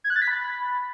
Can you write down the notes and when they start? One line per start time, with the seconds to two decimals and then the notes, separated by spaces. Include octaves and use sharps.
0.04 G#6
0.10 F#6
0.16 A6
0.22 B6
0.28 B5